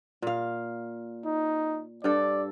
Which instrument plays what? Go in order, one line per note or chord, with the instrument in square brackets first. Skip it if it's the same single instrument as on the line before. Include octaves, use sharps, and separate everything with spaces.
[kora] A#2 F5
[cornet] D#4
[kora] G2 A4 [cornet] D5